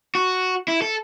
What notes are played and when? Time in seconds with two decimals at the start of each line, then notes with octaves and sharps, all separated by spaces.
0.15 F#4
0.68 E4
0.82 A4